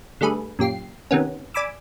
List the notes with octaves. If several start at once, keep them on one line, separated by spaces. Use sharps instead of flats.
D3 G3 A3 G#4 B4
F#2 A#2 G4 C7
C3 D#3 B3 C#4
D5 G#5 B5 D6 E6